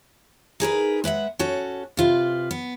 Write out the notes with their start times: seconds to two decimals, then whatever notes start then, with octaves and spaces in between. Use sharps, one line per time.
0.60 D#4 G#4 A#4 B4
1.04 G#3 B4 E5 F#5
1.39 C#4 F#4 A4
1.97 C3 F4 B4
2.51 B3